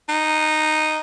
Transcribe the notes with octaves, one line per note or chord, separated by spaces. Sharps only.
D#4